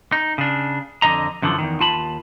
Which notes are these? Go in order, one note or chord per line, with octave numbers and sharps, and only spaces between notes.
D#4
C#3 D4
F2 D3 E3 D#5 A#5
F#2 D3 E3 F3
E2 G#2 D#3
D#2 F4 A5 B5